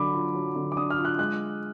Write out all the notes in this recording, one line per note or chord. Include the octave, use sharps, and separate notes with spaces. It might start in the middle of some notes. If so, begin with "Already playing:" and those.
Already playing: D3 F#3 D4 B5 D6
F4
F#3
D3
D6
D4 D#6
F6
F4
F#6
G#3 F#6